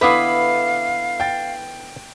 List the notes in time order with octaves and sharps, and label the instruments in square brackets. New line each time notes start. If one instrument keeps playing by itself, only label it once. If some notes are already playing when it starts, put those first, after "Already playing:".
[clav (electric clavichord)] D3 B3 E4 [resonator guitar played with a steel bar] B4 [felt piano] E5 D6 D#6 [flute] F5
[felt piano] G5 A6